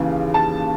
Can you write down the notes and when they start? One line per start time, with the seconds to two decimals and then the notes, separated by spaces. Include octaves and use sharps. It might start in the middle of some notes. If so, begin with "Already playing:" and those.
Already playing: D#2 C#3 E3
0.34 A5